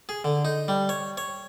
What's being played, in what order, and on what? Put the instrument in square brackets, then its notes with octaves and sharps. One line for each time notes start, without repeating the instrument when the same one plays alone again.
[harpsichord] G#4
D3
D#4
G3
C#5
C#5